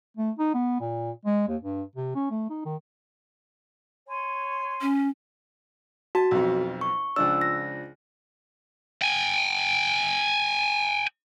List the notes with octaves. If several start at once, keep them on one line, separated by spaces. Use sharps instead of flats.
A3
D#4
B3
A#2
G#3
D#2
G2
C3
C#4
A3
D#4
D#3
C#5 G#5 C6
C#4
F#4 A5
B1 F2
C#6
C#2 F3 D4 E6
A#6
G5 G#5